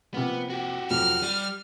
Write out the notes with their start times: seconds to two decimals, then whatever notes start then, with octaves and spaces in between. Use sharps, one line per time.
0.14 C3 F3 A#3 B3
0.50 F#4 G4
0.90 F2 C3 F#3 F6
1.22 G3 D#7